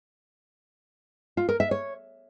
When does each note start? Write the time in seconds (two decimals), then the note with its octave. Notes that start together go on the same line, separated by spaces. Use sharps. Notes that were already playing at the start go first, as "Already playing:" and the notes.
1.37 F4
1.49 A#4
1.60 E5
1.71 C#5